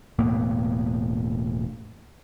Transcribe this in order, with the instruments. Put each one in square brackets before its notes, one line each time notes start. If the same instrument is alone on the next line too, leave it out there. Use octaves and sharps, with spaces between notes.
[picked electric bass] E1 A2 A#3 B3